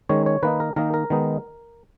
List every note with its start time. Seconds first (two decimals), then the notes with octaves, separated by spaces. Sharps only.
0.09 D#3 G#3 C#4 C#5
0.26 C#5
0.43 D#3 A#3 D#4 B4
0.60 A#4
0.76 D#3 A#3 D#4 A#4
0.94 A#4
1.10 D#3 G#3 B3 D#4